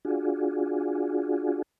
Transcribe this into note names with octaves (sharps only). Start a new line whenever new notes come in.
D4 F4 F#4 G#4